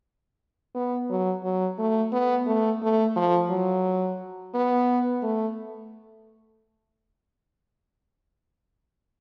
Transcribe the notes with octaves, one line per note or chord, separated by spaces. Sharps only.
B3
F#3
F#3
A3
B3
A3
A3
F3
F#3
B3
A3